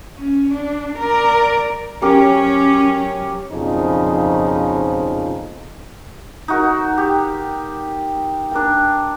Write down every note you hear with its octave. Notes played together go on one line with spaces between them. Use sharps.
C#4
D4
A#4 D5
F#3 C#4 G4 A#4 A#5
B1 F2 A#2 C#3 F3 D#4
D#4 F#4 A#4
G4
D4 A#4 G5